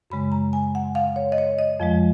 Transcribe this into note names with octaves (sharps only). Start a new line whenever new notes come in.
F#2 C#3 G#3 B5
A#5
G#5
F#5
F5
C#5
D#5
C#5
D#5
F2 F3 G#3